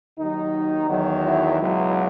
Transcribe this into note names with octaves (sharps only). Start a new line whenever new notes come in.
D#2 D#3 F#3 D#4
E2 D#3 F#3
E4
C#2 B2 F#3